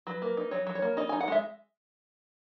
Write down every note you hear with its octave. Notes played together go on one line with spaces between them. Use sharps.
F#3 B4
A#3
D#4
F#3 C#5
F#3
C#5
A#3
D#4 D#5
D#4 G#5
F#5
G#3 E5